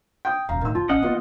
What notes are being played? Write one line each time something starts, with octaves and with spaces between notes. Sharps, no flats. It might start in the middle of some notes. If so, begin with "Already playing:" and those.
G5 D#6 G6
D#1 F#2 F5 A#5
A2 D#3 E6
F2 F4 A5
A1 C#4 D#5 F#5
D#3 A#3 B3 F4